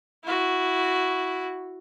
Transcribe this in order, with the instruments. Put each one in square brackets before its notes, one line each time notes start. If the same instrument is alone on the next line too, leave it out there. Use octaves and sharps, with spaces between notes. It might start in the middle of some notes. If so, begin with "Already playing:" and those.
[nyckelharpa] E4 F#4